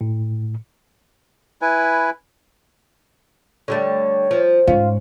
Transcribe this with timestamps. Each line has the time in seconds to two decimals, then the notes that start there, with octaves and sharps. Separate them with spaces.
0.01 A2
1.62 E4 B4 G#5
3.68 D3 G3 A3 C#5
4.31 F3
4.67 G#2 C#4 F4